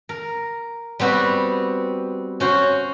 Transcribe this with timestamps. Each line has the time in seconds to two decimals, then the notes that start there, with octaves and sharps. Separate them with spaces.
0.09 A#4
0.99 G3 B3 C4 F#4 B4
2.40 C#4 F#4 C5